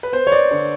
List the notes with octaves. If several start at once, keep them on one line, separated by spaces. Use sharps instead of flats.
B4
B3 C5
C#5
D5
D3 C#5